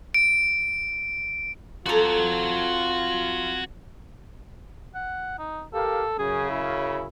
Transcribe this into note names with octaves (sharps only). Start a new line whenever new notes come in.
D7
F2 F4 F#4 A4 A#5
F#5
D#4
G4 A4 A#4 F5
F#2 C#3 G#4
E4